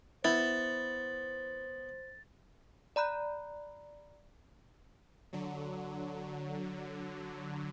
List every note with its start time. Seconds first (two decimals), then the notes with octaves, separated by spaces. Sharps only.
0.25 B3 E4 C5 A6
2.96 D5 A#5 B5 F#6
5.33 D3 F#3